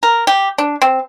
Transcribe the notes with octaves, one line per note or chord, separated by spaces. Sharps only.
A#4
G4
D4
C4